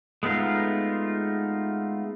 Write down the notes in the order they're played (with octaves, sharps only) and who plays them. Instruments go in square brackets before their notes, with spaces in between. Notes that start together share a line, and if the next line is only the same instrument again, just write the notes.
[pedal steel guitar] G#3 A3 B3 D#4 F4